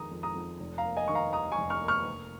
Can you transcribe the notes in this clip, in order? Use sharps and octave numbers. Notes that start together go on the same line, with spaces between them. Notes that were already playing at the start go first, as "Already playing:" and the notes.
Already playing: F2 D#3 G#3 A#5 D#6
F2
A#5 D#6
F2
F1
F5 A#5
A#3
D#5 G#5
D#3 C#6
F5 A#5
D#2 A#5 D#6
G#5 C#6
F1
C#6 F6
A#3
C#6 F6
F1